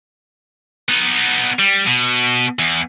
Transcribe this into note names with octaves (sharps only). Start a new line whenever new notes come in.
B3 D#4
G3
B2
E2